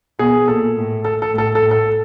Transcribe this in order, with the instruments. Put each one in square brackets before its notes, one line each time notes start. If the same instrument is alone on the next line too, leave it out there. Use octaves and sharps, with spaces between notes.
[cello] B2 [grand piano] G#4
[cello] A#2 [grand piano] A4
[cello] A2
[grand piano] A4
A4
[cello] A2
[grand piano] A4
A4
[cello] A2
[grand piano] A4